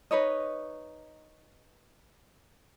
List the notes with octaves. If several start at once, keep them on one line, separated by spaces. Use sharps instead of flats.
D#4 B4 C#5 D#5